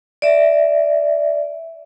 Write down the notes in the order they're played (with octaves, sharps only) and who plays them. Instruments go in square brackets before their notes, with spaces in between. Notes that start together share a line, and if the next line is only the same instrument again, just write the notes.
[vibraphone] D5 E5